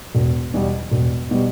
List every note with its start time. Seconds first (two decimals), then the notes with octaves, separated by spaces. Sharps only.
0.15 E1
0.54 E2 B2 G3
0.91 E1
1.31 B2 G3